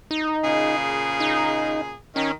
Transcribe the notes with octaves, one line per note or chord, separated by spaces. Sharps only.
D#4
A#2 C#3 G#4
D#4
D#3 C#4